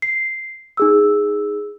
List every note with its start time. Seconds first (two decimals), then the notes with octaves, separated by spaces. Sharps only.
0.02 C7
0.77 D#4 G#4 E6